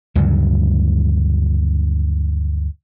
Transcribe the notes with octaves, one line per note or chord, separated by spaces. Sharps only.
D2 G2 C#3 F#3